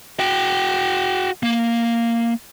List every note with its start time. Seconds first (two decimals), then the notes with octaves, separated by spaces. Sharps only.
0.19 F#4 G5
1.43 A#3